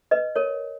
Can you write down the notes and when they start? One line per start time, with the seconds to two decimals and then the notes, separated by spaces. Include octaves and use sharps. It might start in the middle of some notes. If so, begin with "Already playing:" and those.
0.11 B4 D#5
0.36 A#4 C#5